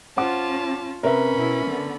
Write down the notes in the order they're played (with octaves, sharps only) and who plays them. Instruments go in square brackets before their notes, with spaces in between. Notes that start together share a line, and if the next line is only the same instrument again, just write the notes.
[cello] C#4 F4 [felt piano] C5 F#5 D6 [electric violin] A5
[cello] C3 [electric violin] C#4 B5 [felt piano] A#4 B4 E5
[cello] B2 E4
D3 B3